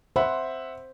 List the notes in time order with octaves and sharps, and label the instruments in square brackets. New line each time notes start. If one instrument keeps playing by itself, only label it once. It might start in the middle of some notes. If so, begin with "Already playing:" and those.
[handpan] C5 [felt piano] E5 F#5 B5